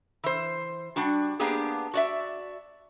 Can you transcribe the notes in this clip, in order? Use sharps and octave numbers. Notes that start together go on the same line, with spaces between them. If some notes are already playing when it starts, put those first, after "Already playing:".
E3 C5
G3 D4 F#4
A#3 B3 D4 G4 G#4
F#4 D5 E5